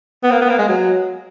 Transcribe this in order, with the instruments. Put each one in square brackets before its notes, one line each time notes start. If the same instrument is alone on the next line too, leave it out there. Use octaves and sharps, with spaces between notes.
[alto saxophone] B3
A#3
B3
A#3
G#3
F#3